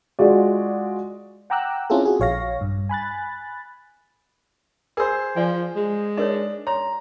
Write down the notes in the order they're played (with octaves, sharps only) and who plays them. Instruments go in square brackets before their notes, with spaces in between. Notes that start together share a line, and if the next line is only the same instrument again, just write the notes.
[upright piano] G#3 F4 F#4 D5
[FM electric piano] F#5 G5 A#5 D6 E6 F#6
C4 C#4 E4 F4 G#4 A4
F#4 G#4
A#1 C#5 F5 A#6
G2
G#5 B5 F#6 A6
[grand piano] G#4 C5 [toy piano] A#4 E6
[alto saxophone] F3 [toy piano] D5 G#5
[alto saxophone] G#3
[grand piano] D4 [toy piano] D#4 A#4 C#5
[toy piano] C#5 C6 [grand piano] A#5